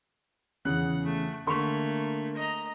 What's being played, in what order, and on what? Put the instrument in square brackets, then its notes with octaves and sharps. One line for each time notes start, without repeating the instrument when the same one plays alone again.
[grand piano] E2 C#3 F#6 [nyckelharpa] F#5
[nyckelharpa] A3
[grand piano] D3 C6 C#6 [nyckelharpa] A3 A#3
[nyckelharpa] D#5 A#5